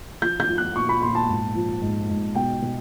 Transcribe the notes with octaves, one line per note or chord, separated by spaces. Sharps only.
F3 G6
G6
F3
F#6
A#2 C#6
B5
A#2 C6
A5
G#2
F3
G#2
G#2
B2 G5
B2